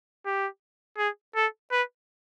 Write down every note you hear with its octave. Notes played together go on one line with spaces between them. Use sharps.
G4
G#4
A4
B4